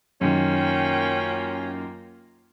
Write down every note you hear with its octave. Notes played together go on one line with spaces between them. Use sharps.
F#2 D#3 A#3 C#4 F4 G5